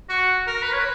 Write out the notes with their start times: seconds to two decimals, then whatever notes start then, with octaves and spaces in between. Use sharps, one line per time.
0.09 F#4
0.47 A#4
0.63 B4
0.73 C#5
0.79 B4